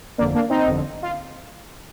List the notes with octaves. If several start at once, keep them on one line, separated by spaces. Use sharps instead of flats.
G1 F2 D3 A#3 D4
A#3 D4
C4 D#4
G1 F2 D3
F4